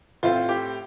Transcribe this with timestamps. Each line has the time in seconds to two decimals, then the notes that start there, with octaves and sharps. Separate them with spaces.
0.23 A2 A3 C4 F4
0.49 G4